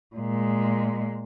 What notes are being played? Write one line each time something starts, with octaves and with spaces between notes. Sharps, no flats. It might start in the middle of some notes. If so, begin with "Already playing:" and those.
A#2 G#3